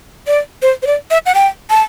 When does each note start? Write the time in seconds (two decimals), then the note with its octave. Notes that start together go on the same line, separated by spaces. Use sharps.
0.27 D5
0.62 C5
0.82 C5
0.87 D5
1.11 E5
1.26 F#5
1.35 G5
1.70 A5